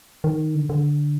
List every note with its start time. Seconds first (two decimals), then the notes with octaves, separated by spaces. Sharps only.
0.24 D#3
0.55 D3
0.69 D3